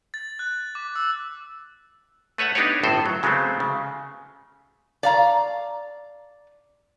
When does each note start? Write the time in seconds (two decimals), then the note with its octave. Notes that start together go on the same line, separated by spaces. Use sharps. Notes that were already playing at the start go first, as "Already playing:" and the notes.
0.14 A6
0.39 F#6
0.75 D6
0.96 E6
2.38 A3 B4 C#5 E5 F#5
2.55 B3 D4 D#4 G4 B4 C#5
2.83 G1 A2 C4 A4 C5
3.06 F#3
3.23 C#3 F#3 G#3 A3 B3 C4
3.60 C#3
5.03 D5 F5 A#5